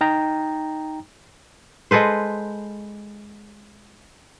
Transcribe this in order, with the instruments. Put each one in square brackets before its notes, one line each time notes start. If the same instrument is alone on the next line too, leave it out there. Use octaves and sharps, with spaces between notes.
[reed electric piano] D#4 G5 A#5
[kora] G#3 A4 B4 C5